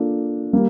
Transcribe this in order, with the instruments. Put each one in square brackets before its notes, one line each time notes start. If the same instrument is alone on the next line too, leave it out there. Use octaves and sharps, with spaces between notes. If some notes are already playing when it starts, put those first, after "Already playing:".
Already playing: [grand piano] A#3 D4 F4 A4
G3 A#3